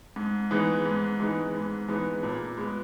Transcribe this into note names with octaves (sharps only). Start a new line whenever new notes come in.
G#2
E3 G#3 B3 D#4
G#2
E3 G#3 B3 D#4
G#2
E3 G#3 B3 D#4
A#2
G#3 B3